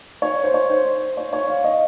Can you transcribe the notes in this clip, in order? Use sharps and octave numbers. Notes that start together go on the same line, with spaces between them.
C#5
C5
C#5
C5
C#5
C#5
F5
D#5